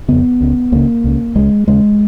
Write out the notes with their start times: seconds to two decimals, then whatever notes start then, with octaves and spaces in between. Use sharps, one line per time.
0.08 F2 C#3 B3
0.40 C#2 C#3
0.72 C#2 C#3 A#3
1.04 C#2 C#3
1.35 C#2 C#3 G#3
1.67 D#2 C#3 G#3